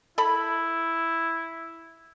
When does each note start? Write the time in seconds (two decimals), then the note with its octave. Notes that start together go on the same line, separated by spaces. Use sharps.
0.18 E4 A4 B5